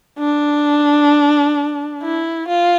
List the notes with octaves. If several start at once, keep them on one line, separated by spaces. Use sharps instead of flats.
D4
E4
F4